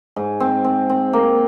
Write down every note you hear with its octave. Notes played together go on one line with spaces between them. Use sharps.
G#2
C4
C4
C4
A#3